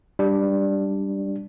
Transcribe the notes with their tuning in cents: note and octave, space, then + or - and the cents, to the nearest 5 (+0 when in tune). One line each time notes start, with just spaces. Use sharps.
G3 +0 D4 +0